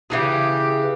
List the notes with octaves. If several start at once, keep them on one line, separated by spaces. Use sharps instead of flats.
C#3 E3 G4 G#4